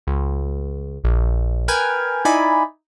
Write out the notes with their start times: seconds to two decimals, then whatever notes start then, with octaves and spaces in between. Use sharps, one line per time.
0.07 C#2
1.04 A#1
1.68 A#4 B4 G5 G#5 F6 G#6
2.25 D#4 E4 D5 G#5 B5